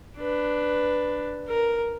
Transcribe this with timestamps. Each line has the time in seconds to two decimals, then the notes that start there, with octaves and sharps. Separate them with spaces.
0.17 D4 B4
1.48 A#4